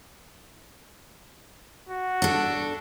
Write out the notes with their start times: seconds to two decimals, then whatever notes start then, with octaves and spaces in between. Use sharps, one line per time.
1.89 F#4
2.22 D4 A4